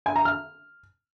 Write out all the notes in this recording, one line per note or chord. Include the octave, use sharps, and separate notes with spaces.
G#5
A#5
F6